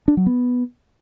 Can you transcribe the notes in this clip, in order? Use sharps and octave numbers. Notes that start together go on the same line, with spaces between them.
D4
F#3
B3